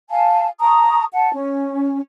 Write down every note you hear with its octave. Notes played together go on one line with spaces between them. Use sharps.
F5 G#5 A5
A5 A#5 C#6 D#6
F#5 A5
C#4